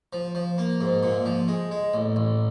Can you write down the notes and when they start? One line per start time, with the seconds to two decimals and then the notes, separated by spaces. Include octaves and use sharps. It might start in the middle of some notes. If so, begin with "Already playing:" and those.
0.13 F3
0.35 F3
0.58 A#3
0.81 G#2
1.03 A#2
1.25 F3
1.48 G#3
1.71 G#3
1.94 A1
2.16 A1